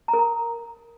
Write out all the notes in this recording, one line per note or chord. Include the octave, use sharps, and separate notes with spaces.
A#5
A#4
A#5